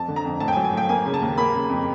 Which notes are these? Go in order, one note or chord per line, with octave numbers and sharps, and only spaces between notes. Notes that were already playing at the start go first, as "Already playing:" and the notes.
Already playing: F2 A5
D3
A#5
F2
A2 A5
G5
G#5
F#3
G#5
A2 G5
A#3 G#5
C#3
A5
D#2
A#3 B5
C#3
F2